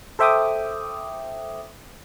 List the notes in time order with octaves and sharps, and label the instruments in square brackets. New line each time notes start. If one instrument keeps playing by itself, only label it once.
[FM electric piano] A4 C5 E5 G5 D6 D#6